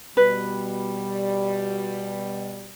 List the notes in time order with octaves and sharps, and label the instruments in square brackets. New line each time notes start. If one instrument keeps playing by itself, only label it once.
[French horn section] B2 G3 [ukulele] B4